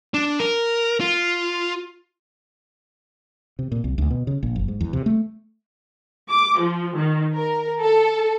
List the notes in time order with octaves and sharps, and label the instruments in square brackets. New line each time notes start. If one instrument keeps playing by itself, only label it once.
[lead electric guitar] D4
A#4
F4
[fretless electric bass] C3
A#2
C2
D2
B2
C#3
A#1
F#1
G#2
E2
C3
A3
[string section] D6
F3
D#3
A#4
A4